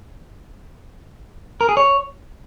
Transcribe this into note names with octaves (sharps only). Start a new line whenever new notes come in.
A#4
G#4
C#5